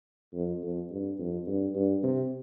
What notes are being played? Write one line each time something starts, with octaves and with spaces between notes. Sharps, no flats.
F2
F2
G2
F2
G2
G2
C3